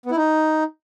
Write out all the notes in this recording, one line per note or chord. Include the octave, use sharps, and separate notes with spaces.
B3
E4
D#4